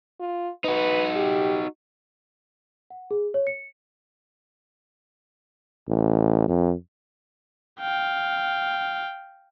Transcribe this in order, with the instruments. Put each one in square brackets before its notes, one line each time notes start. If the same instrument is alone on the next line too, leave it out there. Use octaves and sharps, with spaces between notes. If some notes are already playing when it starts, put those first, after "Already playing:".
[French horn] F4
[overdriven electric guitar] D#4 F#4 [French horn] B4
[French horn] G4
[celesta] F#5
G#4
C#5
C#7
[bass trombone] A1
F2
[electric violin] F5 G5